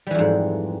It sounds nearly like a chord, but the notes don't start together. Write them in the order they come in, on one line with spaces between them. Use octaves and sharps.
G3 E3 F2 G#2